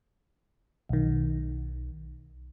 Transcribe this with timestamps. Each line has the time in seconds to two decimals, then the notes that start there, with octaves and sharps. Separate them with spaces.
0.89 B1 D#3